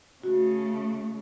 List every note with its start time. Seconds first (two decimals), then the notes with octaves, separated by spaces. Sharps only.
0.24 C#3 A3 F#4